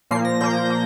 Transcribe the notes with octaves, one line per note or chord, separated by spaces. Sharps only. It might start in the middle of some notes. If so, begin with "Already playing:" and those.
A#2 F3 A#3 C7
A#6
A#2 F3 A#3 G6
A#3